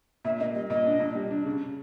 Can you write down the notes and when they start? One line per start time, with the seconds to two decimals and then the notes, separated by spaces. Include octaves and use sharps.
0.25 A#2 E5
0.39 A#3 D#5
0.55 G3 D#5
0.70 A#2 D#5
0.86 D4
1.00 A#2
1.15 G3
1.31 D4
1.45 C#3